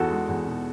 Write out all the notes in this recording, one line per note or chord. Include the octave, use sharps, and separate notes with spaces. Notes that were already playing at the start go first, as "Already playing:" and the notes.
Already playing: E2 F#4 A4
G#3
E2
B2